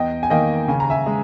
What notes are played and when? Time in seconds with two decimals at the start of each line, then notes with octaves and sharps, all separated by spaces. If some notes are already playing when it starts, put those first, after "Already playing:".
Already playing: E2 D#5 G5
0.23 G#5
0.30 D#3 A#3 D#5 G5
0.68 C#3 G#5
0.80 A#5
0.90 E5 G#5
1.06 G#3